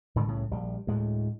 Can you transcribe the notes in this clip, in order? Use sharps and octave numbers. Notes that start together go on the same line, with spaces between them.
G#2 D3 D#3 G3
C2 A2 C#3
A#1 G3
D2 A2 G#3